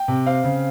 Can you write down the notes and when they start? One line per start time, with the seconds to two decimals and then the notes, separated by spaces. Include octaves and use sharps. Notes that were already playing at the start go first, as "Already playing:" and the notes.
Already playing: G5
0.08 C3
0.26 C4 F5
0.44 C#3